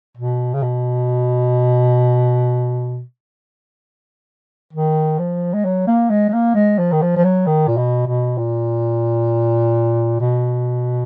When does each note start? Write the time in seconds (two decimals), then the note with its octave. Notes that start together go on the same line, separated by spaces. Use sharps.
0.17 B2
0.54 C#3
0.62 B2
4.73 D#3
5.18 F3
5.54 G#3
5.65 F#3
5.87 A#3
6.09 G#3
6.29 G#3
6.33 A#3
6.55 G#3
6.78 F3
6.92 D#3
7.01 F3
7.16 F3
7.24 F#3
7.47 D#3
7.68 A#2
7.77 B2
8.07 B2
8.38 A#2
10.20 B2